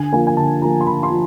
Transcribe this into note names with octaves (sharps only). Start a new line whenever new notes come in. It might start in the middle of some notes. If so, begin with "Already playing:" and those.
Already playing: D3 G#5
F3 A#3 G#5
G#5
D3 A5
F3 A#3 A#5
C6
D3 B5
C6
F3